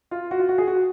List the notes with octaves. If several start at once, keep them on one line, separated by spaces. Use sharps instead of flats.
F4
F#4
F4
F#4
G#4
F#4